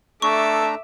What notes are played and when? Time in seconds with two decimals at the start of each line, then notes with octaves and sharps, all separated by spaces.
0.22 A3 D4 A4 E5 A#5 C#6 D6